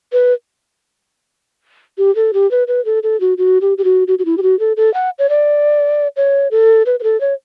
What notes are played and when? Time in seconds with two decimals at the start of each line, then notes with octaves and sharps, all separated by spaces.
0.13 B4
1.98 G4
2.16 A4
2.33 G4
2.51 B4
2.68 B4
2.85 A4
3.03 A4
3.20 F#4
3.38 F#4
3.61 G4
3.78 G4
3.84 F#4
4.08 F#4
4.19 F#4
4.25 E4
4.38 G4
4.43 F#4
4.59 A4
4.77 A4
4.94 F#5
5.19 C#5
5.29 D5
6.16 C#5
6.51 A4
6.86 B4
7.00 B4
7.03 A4
7.21 C#5